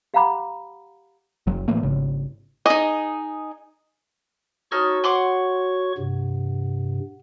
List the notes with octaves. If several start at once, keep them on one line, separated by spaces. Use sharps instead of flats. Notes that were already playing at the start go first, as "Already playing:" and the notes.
G4 F5 F#5 A#5 B5 D6
F#1 F#3
A2 E3 A3 A#3
G#1 C#3
D#4 G#4 D#5
D#4 F#4 A4 C#5 C#6 F6
F#5 C6 D6
G2 C3